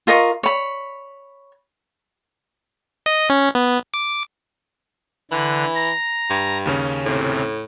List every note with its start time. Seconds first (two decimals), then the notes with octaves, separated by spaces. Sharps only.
0.07 F4 A#4 D#5 C#6
0.43 C#5 B5
3.06 D#5
3.30 C#4
3.55 B3
3.94 D6
5.31 D3 E3 F#6
5.75 A#5
6.30 G2
6.66 D#2 C#3 C#4
7.06 A2 C3